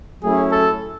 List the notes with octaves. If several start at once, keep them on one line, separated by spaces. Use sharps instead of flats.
F#3 A3 C#4 E4 G#4
A4